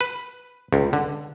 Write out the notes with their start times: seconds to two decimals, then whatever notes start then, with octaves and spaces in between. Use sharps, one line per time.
0.01 B4
0.73 C#2
0.93 D3